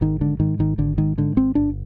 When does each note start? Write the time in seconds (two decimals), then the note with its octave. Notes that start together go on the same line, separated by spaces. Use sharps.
0.01 G#1 D#3
0.21 G#2 D3
0.40 G#2 D#3
0.59 G#1 D#3
0.78 G#1 D3
0.98 G#2 D#3
1.18 G#2 D3
1.37 G#1 C4
1.55 G1 D4